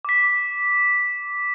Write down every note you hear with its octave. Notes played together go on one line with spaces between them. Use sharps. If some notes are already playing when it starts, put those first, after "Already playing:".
D6 B6